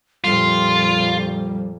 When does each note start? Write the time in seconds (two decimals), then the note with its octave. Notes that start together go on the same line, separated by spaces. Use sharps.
0.24 F2 A#2 G3 F4